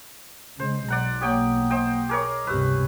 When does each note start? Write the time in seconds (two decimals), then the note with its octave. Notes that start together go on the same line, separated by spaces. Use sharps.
0.60 C#3 G#3 C5
0.88 B1 D5 F#5 A#5
1.21 A#3 G4 C#5 F#5 G5 D#6
1.70 C5 D#5 G5
2.09 G#4 A#4 C#5 D6
2.47 C#2 G2 C3 G4 B4 C#6 E6